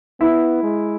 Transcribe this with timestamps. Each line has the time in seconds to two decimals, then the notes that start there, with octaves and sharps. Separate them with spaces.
0.20 B3 E4
0.64 G#3